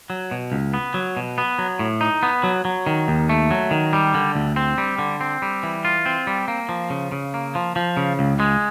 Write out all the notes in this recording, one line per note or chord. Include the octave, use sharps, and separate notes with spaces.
F#3
B2
C#2
B3
F#3
B2
B3
F#3
A2
D#4
B3
F#3
F#3
D#3
D#2
A3
F#3
D#3
G3
D3
D2
C4
G3
D3
C4
G3
E3
F4
C4
G3
A#3
F3
C#3
C#3
A#3
F3
F3
C#3
C#2
G#3